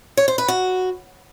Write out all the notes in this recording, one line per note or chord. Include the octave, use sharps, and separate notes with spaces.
C#5
C5
B4
F#4